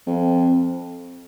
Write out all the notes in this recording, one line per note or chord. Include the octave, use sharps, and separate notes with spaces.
F2